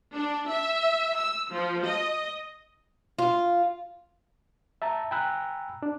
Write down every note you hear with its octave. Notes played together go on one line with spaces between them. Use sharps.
D4
E5
E6
F3
D#5
F4
E5 A5 A#5
G5 G#5 A#5 B5 E6 F#6
D4